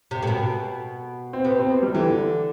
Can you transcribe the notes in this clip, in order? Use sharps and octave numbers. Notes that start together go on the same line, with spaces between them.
C3
A2
B2
C4
C3 B3
C4
B3
G3
D3 E3